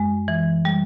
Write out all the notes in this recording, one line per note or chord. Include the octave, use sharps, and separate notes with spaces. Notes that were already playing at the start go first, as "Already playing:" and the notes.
Already playing: F#2 G#3
E3
G3